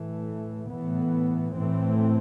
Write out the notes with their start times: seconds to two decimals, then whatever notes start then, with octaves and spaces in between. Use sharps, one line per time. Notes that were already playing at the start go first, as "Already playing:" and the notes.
Already playing: A2 E3 A3
0.70 A2 E3 B3
1.57 A2 E3 A3 C4